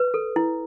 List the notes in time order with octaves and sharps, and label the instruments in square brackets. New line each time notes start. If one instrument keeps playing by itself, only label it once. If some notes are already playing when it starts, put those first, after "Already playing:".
Already playing: [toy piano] B4
A4
E4